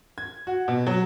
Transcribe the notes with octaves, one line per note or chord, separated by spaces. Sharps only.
G#6
F#4
B2
F#3